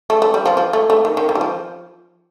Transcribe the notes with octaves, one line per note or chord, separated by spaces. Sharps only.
A3
A3
G3
F3
F3
A3
A3
D#3
D#3
D#3
G3
F3